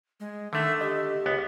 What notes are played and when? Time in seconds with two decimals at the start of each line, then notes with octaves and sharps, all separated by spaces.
0.20 G#3
0.53 D3 D#3 A3 E5
0.81 G4 D#5
1.26 C#2 B3